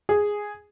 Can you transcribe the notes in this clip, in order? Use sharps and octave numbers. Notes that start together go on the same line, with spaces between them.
G#4